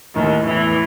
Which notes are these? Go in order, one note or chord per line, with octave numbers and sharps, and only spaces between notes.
D#2 A2 D#3
E2 A2 E3